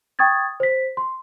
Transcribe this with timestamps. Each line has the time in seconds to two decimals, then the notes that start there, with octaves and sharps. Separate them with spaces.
0.19 G5 C#6 D#6 G#6 A6
0.60 C5 B6
0.97 C6